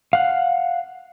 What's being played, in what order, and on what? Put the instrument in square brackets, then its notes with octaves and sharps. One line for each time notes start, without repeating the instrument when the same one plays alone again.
[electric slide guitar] F5 F#5